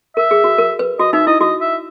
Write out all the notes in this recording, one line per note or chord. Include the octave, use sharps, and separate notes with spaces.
A#4 E5
G#4
F#4
A#4
B4
F#4 D#5
D#4 E5
E4 D#5
F#4 D#5
E5